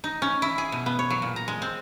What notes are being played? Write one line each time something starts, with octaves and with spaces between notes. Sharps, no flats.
D#4
C#4
E4
G#4
B2
B3
C#5
F#3
A#2
A#5
G#3
C4